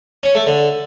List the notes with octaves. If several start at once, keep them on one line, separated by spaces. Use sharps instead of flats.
C#4
A3
D3